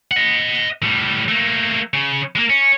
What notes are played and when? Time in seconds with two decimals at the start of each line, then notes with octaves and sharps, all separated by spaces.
0.11 D#5 F#5
0.83 A2 G3
1.28 A3 A#3
1.93 C#3
2.35 G#3 A#3
2.50 C#4